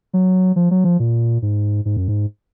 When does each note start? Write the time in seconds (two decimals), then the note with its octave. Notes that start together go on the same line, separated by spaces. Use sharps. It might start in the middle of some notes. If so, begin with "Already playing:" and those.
0.14 F#3
0.56 F3
0.71 F#3
0.84 F3
0.99 A#2
1.42 G#2
1.85 G#2
1.97 F#2
2.08 G#2